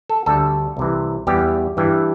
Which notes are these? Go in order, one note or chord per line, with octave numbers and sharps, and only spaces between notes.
A4
D2 D3 G3 A4
C2 C3 E3
E2 E3 G3 G4
G2 E3 G3